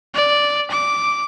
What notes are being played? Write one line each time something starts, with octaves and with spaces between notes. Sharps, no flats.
D5
D6